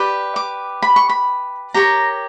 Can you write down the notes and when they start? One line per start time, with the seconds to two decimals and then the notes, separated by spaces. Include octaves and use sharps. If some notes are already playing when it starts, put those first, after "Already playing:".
Already playing: G4 B4 D5
0.36 D6
0.83 B5
0.96 C#6
1.09 B5
1.74 G4 A#4 C#5 A#5